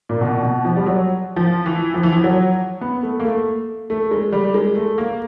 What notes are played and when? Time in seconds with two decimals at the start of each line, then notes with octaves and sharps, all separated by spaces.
0.09 A#2
0.21 B2
0.43 B2
0.65 F3
0.76 G3
0.86 F#3
1.36 F3
1.66 E3
1.94 F3
2.03 E3
2.12 F3
2.24 F#3
2.81 B3
3.03 A3
3.20 A#3
3.25 A3
3.90 A3
4.11 G#3
4.33 G3
4.54 G#3
4.76 A3
4.98 A#3